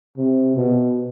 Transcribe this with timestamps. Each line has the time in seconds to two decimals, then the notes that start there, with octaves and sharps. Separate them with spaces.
0.17 C3
0.56 B2